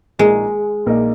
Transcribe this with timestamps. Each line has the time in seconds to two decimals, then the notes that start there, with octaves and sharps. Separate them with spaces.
0.19 A#1 A#2 G#3 A#3 D#4 A#4
0.86 A#1 A#2 A#3 D#4 A#4